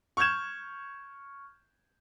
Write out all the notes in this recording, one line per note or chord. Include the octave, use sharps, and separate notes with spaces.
C#6 F6 G6 G#6 E7